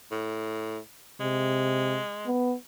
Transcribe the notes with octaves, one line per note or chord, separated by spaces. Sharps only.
A2
C3 G#3
B3